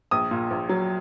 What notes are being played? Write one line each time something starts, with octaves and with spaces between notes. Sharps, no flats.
A#1 D#6
A#2
A#1
F#3